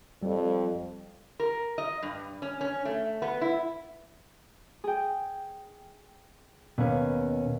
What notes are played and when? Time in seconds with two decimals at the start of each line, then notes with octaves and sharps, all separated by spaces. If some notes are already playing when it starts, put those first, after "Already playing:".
0.23 F2 G3
1.40 A#4
1.78 D#5
2.03 G2
2.42 C#4
2.61 C#4
2.85 A3
3.22 B3
3.41 E4
4.84 G#4 G5
6.78 D#2 B2 C#4 B4